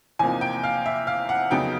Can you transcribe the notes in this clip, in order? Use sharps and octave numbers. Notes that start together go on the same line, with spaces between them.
E2 C3 F3 A#3 D#4 G#5
G5
F5
E5
F5
F#5
F2 C#3 F#3 B3 D#4 G5